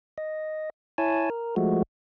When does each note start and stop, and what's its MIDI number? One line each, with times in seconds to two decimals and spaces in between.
0.18 0.70 75
0.98 1.30 64
0.98 1.30 73
0.98 1.30 80
0.98 1.30 81
1.30 1.55 70
1.56 1.83 53
1.56 1.83 56
1.56 1.83 57
1.56 1.83 66